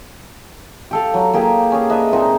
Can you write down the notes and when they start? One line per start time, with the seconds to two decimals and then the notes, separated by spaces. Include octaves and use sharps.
0.91 G4 A4 F5
1.14 F#3
1.34 A#3 G4 G#4
1.72 C#4 G#4
1.90 D4 B4 D#5 E5
2.12 A#2 C4 D#4